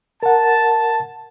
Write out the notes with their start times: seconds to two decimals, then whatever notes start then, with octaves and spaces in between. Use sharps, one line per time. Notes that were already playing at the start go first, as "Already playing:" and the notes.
0.23 A#4 F#5 A5